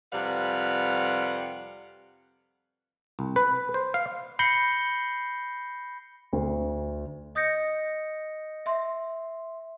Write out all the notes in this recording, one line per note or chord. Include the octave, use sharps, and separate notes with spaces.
F2 C3 G3 B4 F5 F#5
C2
B4
C5
F5
B5 G6 A#6 C7 C#7 G7
D2
D#5 D#6 G6 A#6 C#7
E5 C6